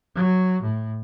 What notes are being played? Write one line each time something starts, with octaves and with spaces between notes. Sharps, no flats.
F#3
A2